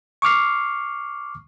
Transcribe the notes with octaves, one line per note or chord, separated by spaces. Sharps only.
C#6 D6 F6 C7